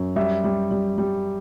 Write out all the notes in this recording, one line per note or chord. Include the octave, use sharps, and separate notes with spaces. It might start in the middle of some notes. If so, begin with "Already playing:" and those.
Already playing: F#2
G3 E5
G3
G3
G3